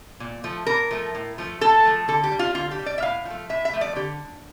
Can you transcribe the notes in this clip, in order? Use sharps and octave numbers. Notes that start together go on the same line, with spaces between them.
A#2
F3 A3
A#2 A#4
F3 A3
A2
F3 A3
A2 A4
F3 A3
D3 A4
G4
G3
F4
D3 F4
G4
G3
D5
E5
A2 F5
F3
A3
A2 E5
E5
F3 A3
D5
D3 G4